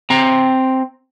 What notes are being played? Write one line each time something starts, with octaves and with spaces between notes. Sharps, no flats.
C4 A#5